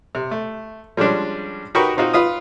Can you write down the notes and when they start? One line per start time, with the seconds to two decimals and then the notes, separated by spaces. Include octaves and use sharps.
0.15 C3
0.31 A3
0.97 F3 G3 G#3 C#4 D4
1.75 D#4 F#4 G4 A#4 B4 C#6
1.97 C4 D#4 F4 F#4
2.13 F4 B4 D#6